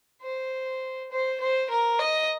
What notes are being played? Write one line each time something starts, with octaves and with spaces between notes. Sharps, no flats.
C5
C5
C5
A#4
D#5